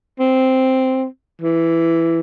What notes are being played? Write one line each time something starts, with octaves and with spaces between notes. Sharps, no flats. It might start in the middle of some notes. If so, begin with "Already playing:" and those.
C4
E3